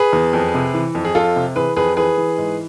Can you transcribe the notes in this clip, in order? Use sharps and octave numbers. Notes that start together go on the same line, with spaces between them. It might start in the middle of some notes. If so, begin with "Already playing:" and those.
Already playing: G#4 B4
E2
F2
C3
E3
F2
G#4
F2 F4 A4
C3
E3 G#4 B4
F2 G#4 B4
E3 G#4 B4
E3
G#2